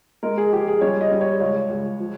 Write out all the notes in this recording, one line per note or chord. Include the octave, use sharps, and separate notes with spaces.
G#3 A#4
G#4
F3 G4
G#4
G3 C#5
D#5
G3
C#5
C#2 C#5
C#2
F3